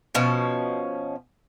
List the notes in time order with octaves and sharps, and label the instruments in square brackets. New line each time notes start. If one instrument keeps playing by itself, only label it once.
[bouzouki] B2 F3 C#4